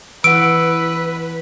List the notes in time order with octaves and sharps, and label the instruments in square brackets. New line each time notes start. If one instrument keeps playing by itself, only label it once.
[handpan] E3 F#5 [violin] B4 [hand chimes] E6 [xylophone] D7